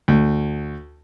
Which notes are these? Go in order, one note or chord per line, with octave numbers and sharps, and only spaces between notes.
D2